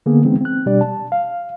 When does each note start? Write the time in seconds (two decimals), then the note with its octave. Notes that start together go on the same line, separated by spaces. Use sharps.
0.06 D3 A#3 B3 G#4
0.24 E3 G#3 B3 C4 D#4
0.41 C4 F#6
0.66 B2 G3 D4 G4 D5
0.81 A5
1.12 F5